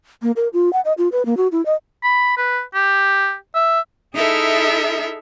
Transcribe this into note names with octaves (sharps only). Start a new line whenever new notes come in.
A#3
A#4
F4
F#5
D#5
F4
B4
A#3
F#4
E4
D#5
B5
B4
G4
E5
D#4 E4 G#4 A4 E5 F6